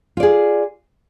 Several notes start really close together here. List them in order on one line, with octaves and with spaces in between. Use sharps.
F4 D5 G#4